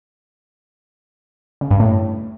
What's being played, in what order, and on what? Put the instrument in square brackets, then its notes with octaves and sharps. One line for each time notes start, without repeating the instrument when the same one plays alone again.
[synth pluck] C#3
G2
A2